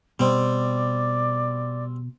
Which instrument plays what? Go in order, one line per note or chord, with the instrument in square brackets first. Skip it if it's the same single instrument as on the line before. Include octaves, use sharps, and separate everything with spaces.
[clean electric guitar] B2 [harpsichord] G3 C4 [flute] D5